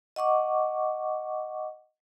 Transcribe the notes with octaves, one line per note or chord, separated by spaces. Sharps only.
D#5 F#5 C#6 D6